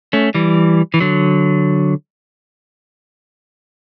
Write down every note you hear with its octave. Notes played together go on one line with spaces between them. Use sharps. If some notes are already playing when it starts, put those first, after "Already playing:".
A3 C#4
E3 G3
E3
D3 F#3